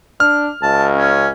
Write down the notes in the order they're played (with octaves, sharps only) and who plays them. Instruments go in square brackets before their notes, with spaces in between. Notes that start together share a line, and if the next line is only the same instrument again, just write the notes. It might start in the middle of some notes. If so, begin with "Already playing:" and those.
[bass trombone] D4 [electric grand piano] F6
[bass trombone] C#2 [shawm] A5
[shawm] C#4